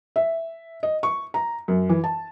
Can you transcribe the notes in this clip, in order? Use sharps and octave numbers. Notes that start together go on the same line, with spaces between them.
E5
D#5
C#6
A#5
F#2
E3
A5